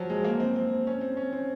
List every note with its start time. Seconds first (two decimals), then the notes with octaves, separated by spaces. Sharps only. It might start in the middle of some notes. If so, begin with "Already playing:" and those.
Already playing: F3 F#3
0.10 G#3
0.24 A#3
0.40 C4
0.56 C4
0.87 C#4
1.01 C4
1.17 C#4
1.33 C4